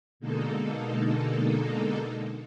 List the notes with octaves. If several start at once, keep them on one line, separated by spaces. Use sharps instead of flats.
B2 D3 G#3 A#3 D#4 A4